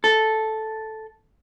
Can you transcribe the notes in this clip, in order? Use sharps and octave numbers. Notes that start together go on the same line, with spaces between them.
A4